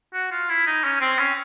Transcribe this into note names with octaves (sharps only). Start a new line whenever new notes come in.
F#4
F4
E4
D#4
C#4
C4
C#4